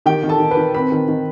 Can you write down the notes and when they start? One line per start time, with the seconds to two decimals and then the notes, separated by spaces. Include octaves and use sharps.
0.06 D#3 G4 G5
0.23 D#3
0.29 A4 A5
0.40 D#3
0.51 B4 B5
0.57 D#3
0.74 C4 B4 B5
0.92 D#3
1.08 D#3